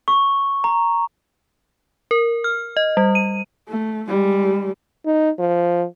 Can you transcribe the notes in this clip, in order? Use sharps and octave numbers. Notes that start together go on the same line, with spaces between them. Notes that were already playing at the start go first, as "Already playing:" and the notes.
C#6
A#5
A#4
F6
D#5
G3
D#7
A3
G3 G#3
D#4
F3